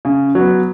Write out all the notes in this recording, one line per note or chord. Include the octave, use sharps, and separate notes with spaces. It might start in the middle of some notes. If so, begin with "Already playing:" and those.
C#3
F#3 B3